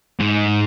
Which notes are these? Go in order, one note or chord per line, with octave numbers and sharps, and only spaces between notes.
G#2